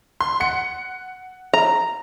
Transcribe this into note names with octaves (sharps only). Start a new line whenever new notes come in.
C6
F#5 C#7
A#5